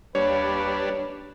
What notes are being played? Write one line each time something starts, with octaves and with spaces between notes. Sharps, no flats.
D#2 G3 D4 B4 C#5